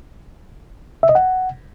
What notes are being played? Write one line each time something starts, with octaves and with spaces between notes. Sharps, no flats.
E5
D#5
F#5